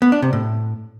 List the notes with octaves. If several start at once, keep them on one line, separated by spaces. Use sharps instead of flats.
B3
D4
C3
A2